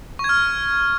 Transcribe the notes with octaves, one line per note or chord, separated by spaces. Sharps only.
C#6
G#6
F6